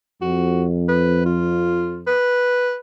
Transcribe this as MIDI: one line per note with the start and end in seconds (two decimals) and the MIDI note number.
0.21 2.12 41
0.21 0.65 66
0.89 1.24 71
1.26 2.00 65
2.07 2.77 71